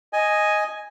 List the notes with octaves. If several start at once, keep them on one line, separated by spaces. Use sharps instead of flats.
D#5 G#5